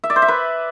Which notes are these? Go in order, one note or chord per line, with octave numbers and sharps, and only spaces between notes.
E5
D5
C5
E5
B4